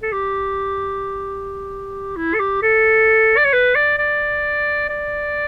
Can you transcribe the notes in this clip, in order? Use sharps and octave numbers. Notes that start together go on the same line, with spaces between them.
A4
G4
E4
A4
G4
A4
D5
C#5
B4
D5
D5
D5